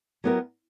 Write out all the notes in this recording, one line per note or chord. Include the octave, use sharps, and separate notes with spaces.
F#3 B3 E4 G4 A#4